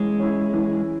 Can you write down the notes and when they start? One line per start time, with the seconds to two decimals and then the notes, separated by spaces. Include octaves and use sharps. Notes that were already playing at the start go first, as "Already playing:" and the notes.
Already playing: E3 G#3 C#4 E4
0.20 C#4 E4
0.54 E3